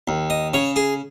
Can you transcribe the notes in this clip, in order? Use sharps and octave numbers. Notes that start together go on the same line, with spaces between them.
D#2
D#5
C#3 C#5
G#4